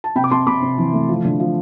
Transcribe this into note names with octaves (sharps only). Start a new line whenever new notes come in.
A5
C3 G5 B5
D6
C3 A5 C6
C3 B5 D6
C3
E3
A3
F3
D3
F3